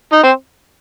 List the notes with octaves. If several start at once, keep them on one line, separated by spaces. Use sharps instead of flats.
D#4
C4